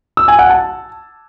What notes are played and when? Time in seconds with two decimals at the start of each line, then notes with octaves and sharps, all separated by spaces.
0.17 E6
0.28 G#5
0.39 F#5
0.50 A5